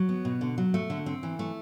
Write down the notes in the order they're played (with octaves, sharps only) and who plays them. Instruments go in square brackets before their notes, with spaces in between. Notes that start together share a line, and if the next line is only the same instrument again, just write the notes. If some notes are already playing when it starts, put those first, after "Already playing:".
Already playing: [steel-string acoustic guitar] F#3
B3
B2
D3
F#3
A3
D3
C4
E3
A3